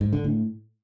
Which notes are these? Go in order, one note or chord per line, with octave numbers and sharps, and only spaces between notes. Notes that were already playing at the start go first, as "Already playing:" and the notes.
G#2
D3
A2